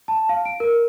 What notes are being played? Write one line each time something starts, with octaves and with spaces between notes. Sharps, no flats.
A5
F5
D7
A#4